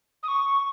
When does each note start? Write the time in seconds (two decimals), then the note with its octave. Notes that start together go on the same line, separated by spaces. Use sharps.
0.23 D#6
0.28 C#6